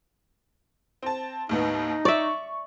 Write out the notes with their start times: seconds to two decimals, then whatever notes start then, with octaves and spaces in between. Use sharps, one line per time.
1.03 C4 A5
1.49 D#2 A2 B3 D#4
2.05 D5 E5 C#6